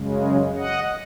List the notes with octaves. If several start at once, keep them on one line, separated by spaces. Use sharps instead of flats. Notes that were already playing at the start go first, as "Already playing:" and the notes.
Already playing: F#2 C#3 G#3
D#5 F#5